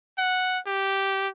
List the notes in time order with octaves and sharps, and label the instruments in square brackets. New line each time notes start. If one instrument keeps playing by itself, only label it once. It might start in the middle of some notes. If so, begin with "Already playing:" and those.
[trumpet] F#5
G4